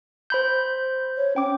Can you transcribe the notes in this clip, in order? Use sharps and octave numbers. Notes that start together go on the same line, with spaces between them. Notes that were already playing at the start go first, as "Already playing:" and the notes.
C5 B5 G6
C#5
C#4 G5 D6